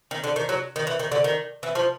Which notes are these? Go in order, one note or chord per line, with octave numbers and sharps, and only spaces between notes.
D#3
D3
D#3
F#3
D#3
E3
D#3
D3
D#3
E3
F3